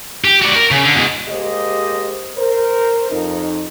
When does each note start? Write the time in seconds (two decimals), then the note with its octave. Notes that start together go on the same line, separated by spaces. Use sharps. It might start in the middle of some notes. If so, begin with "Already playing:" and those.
0.25 G4
0.42 F#4 D5
0.55 A#4
0.71 C#3
0.84 D3
0.95 B2 G#3
1.28 G#3 A#3 G4 C5 D#5
2.37 A#4 C5
3.11 F2 D#4